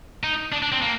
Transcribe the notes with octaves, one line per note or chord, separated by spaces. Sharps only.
D#4
D4
D4
C4
A#3